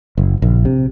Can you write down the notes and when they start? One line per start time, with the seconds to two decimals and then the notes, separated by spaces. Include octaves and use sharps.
0.18 F#1
0.42 A#1
0.65 C3